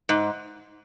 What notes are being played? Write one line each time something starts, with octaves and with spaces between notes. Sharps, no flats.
G#2